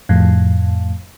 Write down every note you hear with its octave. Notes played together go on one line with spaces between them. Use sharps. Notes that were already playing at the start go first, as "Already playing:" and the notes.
F2 A2